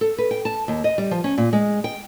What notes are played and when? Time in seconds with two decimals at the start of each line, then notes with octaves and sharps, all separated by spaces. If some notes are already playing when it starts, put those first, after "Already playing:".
0.01 A4
0.18 B4
0.31 G5
0.45 A5
0.68 D#2
0.84 D#5
0.98 G3
1.11 F3
1.24 C#4
1.38 A#2
1.53 G#3
1.84 G5